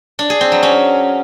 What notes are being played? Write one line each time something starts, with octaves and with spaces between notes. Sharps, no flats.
D4
G#4
C4
F#3
C#4